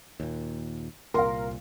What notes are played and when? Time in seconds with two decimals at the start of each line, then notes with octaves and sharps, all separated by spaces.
0.20 D#2 A#2
1.14 C2 A#2 A#4 F5 C6